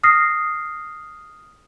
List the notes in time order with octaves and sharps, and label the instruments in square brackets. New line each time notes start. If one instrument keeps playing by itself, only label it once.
[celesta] D#6 F6 A#6 C7